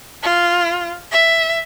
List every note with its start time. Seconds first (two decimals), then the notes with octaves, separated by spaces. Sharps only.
0.23 F4
1.12 E5